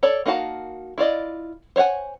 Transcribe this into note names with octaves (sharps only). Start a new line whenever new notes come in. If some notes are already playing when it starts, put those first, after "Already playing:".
A4 C#5 D5
A#3 D#4 F#4 F5 A5
E4 F4 D5 D#5
C5 C#5 F5 F#5 G#5